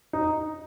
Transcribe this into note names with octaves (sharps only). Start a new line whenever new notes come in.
D#4